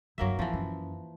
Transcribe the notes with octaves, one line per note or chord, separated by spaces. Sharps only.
G2 D3 F#3 A#3 E5
E3 F3 C4
F#2 C#4